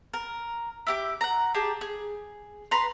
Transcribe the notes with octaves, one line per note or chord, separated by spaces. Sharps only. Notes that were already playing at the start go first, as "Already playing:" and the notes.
A#4
E4 G4 D6
F#5 A#5
G4 G#4 A5
G#4
B4 A#5 C6